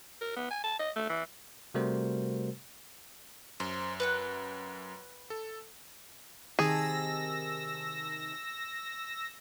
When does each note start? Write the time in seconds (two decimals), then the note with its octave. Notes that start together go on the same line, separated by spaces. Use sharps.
0.21 A#4
0.37 B3
0.51 G#5
0.64 A5
0.79 D#5
0.96 A3
1.09 E3
1.74 C3 G3 A3 F#4 A#4 C5
3.60 F#2 C5
4.00 B4 F#5 G5
5.30 A4
6.59 C3 D#3 G#4 A5 E6 A#6